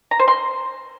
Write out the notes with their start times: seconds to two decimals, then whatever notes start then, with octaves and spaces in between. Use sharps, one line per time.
0.11 A#5
0.19 C5
0.28 C6